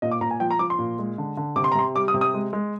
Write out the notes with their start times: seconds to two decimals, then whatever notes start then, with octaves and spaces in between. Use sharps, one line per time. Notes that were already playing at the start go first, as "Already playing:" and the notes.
0.02 A#2 D#5
0.11 D6
0.21 A#2 A#5
0.31 G#5
0.40 F3 G5
0.51 A#5
0.59 F3 D6
0.70 C6
0.79 A#2
0.99 G#3
1.18 D3
1.37 D3
1.56 C3 D6
1.64 C6
1.72 A#5
1.75 C3 C6
1.95 G3 D6
2.08 D#6
2.14 C3
2.21 D#6
2.34 G#3
2.53 G#3